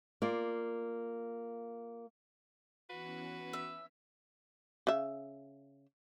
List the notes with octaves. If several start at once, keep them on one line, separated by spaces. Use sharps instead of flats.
A#3 F4 D5
E3 B3 C#4 F#4 B4
E5
C#3 E5